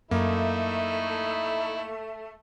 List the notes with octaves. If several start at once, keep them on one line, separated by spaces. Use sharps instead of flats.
F#2 A3 A#3 D#4 E4